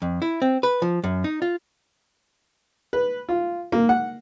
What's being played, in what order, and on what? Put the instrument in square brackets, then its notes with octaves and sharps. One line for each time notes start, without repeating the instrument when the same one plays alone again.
[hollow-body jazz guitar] F2
E4
C4
B4
F3
F#2
D#4
F4
[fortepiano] B4
F4
A#3
F#5